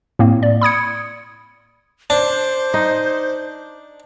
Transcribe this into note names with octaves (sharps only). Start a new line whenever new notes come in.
A2 A#3 C4
D5
B5 D#6 G#6 C#7
D4 C5
D#4